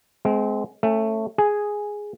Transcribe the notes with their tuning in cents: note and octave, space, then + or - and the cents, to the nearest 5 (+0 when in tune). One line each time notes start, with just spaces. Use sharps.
G#3 +25 C4 -20
A3 +10 C#4 -25
G#4 +0 G#5 +0